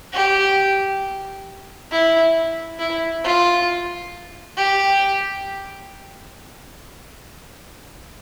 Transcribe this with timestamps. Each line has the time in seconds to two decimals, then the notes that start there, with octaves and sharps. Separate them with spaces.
0.13 G4
1.91 E4
2.79 E4
3.24 F4
4.57 G4